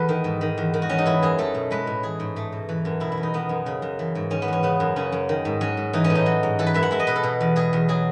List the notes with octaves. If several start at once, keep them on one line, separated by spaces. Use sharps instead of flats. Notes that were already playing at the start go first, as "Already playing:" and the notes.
Already playing: E2 A4 B4
D#3
G#2
D#3
E2
D#3
F#4
E2 C#4
D#4
E3 E4
F#2 G#4
A3 A4
B2
G#3 B4
A2
E3 G#4
G#2
A3
B2
E3
F#2
B2 E4
E4
E2
D#4
D#3 B3
F#2
C#3
F#2
E3
G#2
D#3 C#4
B3
E2 C#4
C#3 B3
F#2
C#3 C#4
F#2
D#3
G#2
F#3 C#4
G#2
E3 D#4
C#4
A2
D#4
F#3
G#2
E3 A4
B4
F#2 E5
F#5
G#3 E5
D#5
B2 B4
A4
B2
E2
B2 G#4
E2
F#3 G#4